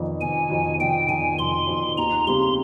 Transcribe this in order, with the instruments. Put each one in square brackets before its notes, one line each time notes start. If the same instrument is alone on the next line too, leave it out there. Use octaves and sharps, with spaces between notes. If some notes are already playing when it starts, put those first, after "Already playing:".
Already playing: [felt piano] F1 F2 D#3
[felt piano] F1 [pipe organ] G#5
[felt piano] F2 D#3
[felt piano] F1 [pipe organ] G5
[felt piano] F2 D#3 [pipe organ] G#5
[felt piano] F1 [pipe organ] C6
[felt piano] F2 D#3
[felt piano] D#2 [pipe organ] A#5
[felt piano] C#3 G3 C4 G4 [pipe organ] C6